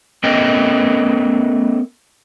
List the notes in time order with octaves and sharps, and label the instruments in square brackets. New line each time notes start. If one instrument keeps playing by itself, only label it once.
[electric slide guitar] A3 B3 C#4 A#4 D#5 G5